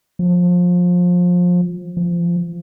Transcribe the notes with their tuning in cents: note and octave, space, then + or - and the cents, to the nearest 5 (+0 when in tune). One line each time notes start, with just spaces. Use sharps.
F3 +25
F3 -20